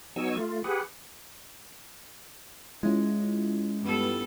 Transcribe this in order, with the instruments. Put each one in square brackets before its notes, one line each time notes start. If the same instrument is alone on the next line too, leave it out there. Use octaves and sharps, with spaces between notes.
[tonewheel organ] F#3 B3 D#4 G#5 C#6 E6
A3 F4
G4 G#4 B4 F#5
[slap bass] G#3 [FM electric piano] C#4 E4 F4
[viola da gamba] G2 B3 A4